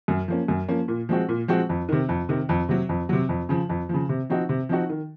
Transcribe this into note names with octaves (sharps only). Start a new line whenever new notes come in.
F#2
F3 A#3 C#4
F#2
F3 A#3 C#4
A#2
F3 G#3 C4 F#4
A#2
F3 G#3 C4 F#4
F2
C3 D#3
F2
C3 D#3
F2
C3 F#3
F2
C3 F#3
F2
C#3 F3
F2
C#3 F3
C3
F3 C4 D#4 F#4
C3
F3 C4 D#4 F#4
D#3